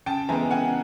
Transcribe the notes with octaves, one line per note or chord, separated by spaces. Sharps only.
C#3 G5 A5
E3 G#3 B3 G#5 A#5
C#3 F#5 G#5